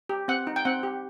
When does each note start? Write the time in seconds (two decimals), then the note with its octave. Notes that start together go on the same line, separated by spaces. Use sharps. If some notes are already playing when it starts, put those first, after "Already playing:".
0.09 G4
0.28 C4 F#5
0.47 D#4
0.56 G5
0.65 C4 F#5
0.83 G4